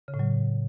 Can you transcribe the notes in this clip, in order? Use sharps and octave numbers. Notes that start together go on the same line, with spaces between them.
C#3
A2
F#3